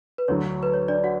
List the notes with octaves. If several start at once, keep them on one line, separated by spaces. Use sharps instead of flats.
B4
D2 D3 F#3 C#5
B4
C#5
D4 D5
F#4 F#5